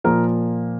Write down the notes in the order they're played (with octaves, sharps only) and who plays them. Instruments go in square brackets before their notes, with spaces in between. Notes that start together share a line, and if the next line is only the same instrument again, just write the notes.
[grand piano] A#2 F3 A#3 A#4